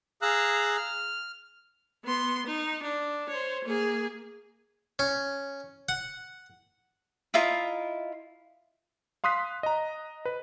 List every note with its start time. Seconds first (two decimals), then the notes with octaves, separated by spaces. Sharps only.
0.22 G#4 F5 A#5 E6 F#6
0.77 F6
2.05 B3 C6
2.46 D#4
2.83 D4
3.29 C5 C#5
3.65 A#3 G#4
4.99 C#4
5.89 F#5
7.34 E4 F4 D#5 A#5
9.24 F5 C6 D#6 F#6 B6
9.63 D#5 A#5
10.25 B4